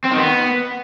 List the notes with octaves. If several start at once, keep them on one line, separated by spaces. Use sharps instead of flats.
C4
D#3
B3